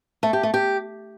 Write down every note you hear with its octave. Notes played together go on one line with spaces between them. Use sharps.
A3
G4
A3
G4